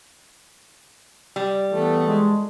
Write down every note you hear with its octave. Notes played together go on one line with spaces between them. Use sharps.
G3
E3 A3 B3
G#3